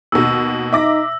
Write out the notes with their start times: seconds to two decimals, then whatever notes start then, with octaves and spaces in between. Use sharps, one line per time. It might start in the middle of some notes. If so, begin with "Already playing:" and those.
0.12 D#2 B2 E6
0.73 D#4 E5 D6 A#6